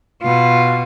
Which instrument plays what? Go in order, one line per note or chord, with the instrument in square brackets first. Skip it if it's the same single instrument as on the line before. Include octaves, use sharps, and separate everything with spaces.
[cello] B2 F4